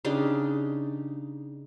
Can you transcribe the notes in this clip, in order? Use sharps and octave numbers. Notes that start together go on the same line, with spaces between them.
C#3 D4 D#4 G4